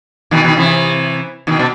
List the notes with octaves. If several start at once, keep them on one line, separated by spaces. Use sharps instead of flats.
B2 D#3
B2 D#3
C3 E3
B2 D#3
B2